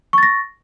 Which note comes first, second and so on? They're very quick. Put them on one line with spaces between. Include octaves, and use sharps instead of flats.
C#6 A6 A#6